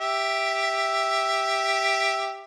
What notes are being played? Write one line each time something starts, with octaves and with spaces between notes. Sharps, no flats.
G4 E5